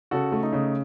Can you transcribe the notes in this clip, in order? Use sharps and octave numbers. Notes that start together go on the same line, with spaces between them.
C#3 F#4 A4
A3
D#4
C#3